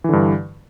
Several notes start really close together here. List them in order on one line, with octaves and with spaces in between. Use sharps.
E3 D3 G2